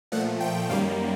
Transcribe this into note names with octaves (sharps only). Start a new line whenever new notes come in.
A#2 F3 A3 F#5
G5
F#2 D#3 G3 A#3 F5